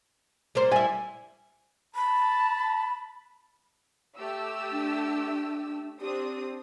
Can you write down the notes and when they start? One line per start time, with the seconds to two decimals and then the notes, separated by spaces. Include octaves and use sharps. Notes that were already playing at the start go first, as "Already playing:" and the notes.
0.55 G3 A#3 C5
0.71 G3 E4 G#5
1.95 A5 B5
4.17 A3 G4 E6
4.72 D4
6.01 C4 D4 G4 D#6